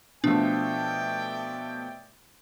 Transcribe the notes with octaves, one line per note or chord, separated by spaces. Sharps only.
B2 F3 A3 D4 D5 E5 G5